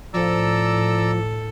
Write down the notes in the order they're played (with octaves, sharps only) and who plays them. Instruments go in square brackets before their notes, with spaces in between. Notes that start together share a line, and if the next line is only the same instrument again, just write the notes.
[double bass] A2 [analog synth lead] F3 [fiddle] A4 [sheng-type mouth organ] D5 A#5 E6